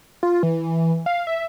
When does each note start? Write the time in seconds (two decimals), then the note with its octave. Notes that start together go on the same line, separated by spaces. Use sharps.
0.23 F4
0.43 E3
1.06 F5
1.27 E5